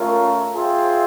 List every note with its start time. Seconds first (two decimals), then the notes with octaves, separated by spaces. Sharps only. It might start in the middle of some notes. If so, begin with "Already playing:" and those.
Already playing: A3 C#4 F4 A#4
0.55 F4 G#4 C5 E5 G5